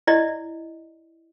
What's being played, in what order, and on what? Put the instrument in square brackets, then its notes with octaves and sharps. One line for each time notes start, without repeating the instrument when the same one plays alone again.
[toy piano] E4 D5 D#5